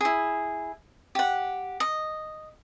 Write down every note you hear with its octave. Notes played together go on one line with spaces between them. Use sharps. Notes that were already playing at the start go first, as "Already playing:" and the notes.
E4 G#4
G4 F#5
D#5